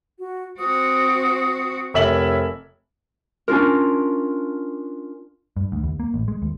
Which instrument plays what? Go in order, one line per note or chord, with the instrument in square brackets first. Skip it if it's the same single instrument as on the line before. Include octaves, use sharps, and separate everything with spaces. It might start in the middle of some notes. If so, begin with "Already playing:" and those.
[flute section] F#4
[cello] C4 F#4 [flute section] D#6
[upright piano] F1 E5 F#7 [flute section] A#4 C#5
[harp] C#4 D4 F4 A#4
[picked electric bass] G2
D2
D#2
A#3
A1
G#3
D#2